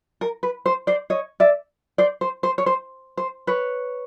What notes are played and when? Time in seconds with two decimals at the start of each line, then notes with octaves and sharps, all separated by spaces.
0.21 A#4
0.43 B4
0.66 C5
0.87 C5 D5
1.10 C#5 D#5
1.40 D5 E5
1.98 C5 D5
2.21 C5
2.43 C5
2.58 C#5
2.66 C5
3.17 C5
3.47 B4 C#5